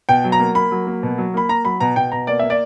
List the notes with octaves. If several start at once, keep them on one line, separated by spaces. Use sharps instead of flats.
B2 G5
F#3
A#5
A#3
A#3 B5
F#3
A#3
B2
F#3
A#3 B5
A#3 A#5
F#3 B5
B2 A#5
B2 G5
B2 A#5
A#3 D5
A#3 E5
D5